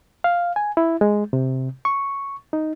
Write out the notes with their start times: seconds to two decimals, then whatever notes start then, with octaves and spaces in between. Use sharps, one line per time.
0.24 F5
0.56 G#5
0.77 E4
1.01 G#3
1.33 C3
1.85 C#6
2.53 D#4